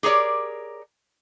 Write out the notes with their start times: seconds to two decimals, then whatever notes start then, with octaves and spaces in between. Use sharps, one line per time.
0.03 G4 G#4 A#4 C#5 D5